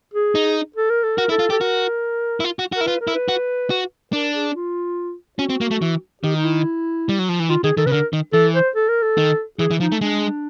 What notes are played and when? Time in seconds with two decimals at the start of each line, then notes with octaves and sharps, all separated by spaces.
0.14 G#4
0.35 D#4
0.76 A4
0.90 A#4
1.04 A4
1.17 F#4 A#4
1.29 E4 A4
1.39 F4
1.50 G4 A4
1.61 F#4 A#4
2.40 E4
2.44 F4
2.59 F#4
2.72 F#4
2.77 E4 A#4
2.87 F4 B4
3.01 A#4
3.07 E4
3.15 B4
3.28 F#4
3.70 F#4
4.13 D4 A#4
4.34 G#4
4.55 F4
5.39 C#4 F#4
5.50 C4
5.61 A#3
5.71 A3
5.82 E3
6.23 D#3 G4
6.35 D#4
6.44 E4
7.09 G3
7.19 F#3
7.29 F3
7.40 E3
7.49 D#3 F4
7.64 D#3 G#4
7.77 D#3 A4
7.86 C#3 B4
7.91 D3 A#4
8.13 D#3
8.33 E3 A4
8.55 C5
8.76 A4
8.89 A#4
9.03 A4
9.18 D#3
9.59 E3 G#4
9.71 E3
9.80 F3 D#4
9.92 A3
10.01 G#3 D4